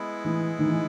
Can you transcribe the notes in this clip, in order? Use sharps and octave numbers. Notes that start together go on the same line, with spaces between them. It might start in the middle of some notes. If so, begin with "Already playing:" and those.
Already playing: G#3 B3 E4
E3
D#3
E3